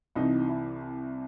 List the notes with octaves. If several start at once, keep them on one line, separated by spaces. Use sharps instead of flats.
C2 C3 E3 D#4
E4